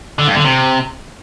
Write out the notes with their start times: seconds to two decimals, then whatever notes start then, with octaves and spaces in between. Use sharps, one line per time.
0.19 D3
0.27 G2
0.36 D3
0.45 C3